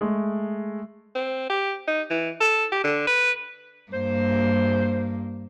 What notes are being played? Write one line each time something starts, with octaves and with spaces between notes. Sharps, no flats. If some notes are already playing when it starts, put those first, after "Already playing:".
G#3 A3
C4
G4
D#4
E3
A4
G4
D3
B4
G2 A#3 C5